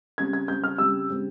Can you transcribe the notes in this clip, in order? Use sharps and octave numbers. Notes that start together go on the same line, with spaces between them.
C#3 G3 C4 G#6
G#6
C#3 G3 C4 G6
F6
C#3 G3 C4 E6
C#3 G3 C4